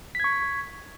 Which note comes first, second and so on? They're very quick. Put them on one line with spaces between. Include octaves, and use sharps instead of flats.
B6 G#6 C#6